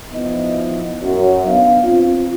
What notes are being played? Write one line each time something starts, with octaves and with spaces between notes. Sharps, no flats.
F3 B3 D#4 E4 D#5
F#2
B3 D4 D#4 F5
C4 F4